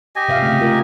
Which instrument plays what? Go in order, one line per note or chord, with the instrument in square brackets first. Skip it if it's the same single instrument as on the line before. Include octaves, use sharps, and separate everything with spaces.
[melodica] G4 D#5 G#5
[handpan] C3 E5 F5
C#3 A3
A3 F4 A#4